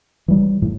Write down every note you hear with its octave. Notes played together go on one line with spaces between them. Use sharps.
E3 G3
A2